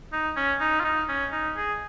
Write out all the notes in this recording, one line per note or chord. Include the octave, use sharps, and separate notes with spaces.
D#4
C#4
D#4
F4
D#4
C#4
D#4
G#4